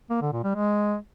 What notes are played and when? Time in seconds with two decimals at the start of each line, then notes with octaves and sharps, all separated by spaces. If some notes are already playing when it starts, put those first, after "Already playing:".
0.10 A#3
0.21 D3
0.33 A#2
0.44 G3
0.55 G#3